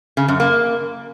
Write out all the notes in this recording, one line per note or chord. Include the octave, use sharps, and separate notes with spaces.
C#3
F#2
A#3